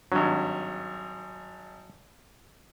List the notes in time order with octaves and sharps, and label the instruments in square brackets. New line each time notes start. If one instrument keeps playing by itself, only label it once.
[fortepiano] G#1 G2 [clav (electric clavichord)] F#3